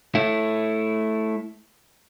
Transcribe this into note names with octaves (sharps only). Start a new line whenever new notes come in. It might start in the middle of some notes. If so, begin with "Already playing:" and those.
A3 E4